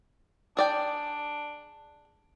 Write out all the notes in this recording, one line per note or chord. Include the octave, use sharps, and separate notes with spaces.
D4 G#4 D5 G5